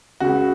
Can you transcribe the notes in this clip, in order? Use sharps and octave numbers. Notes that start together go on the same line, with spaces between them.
C#2 C#3 F#4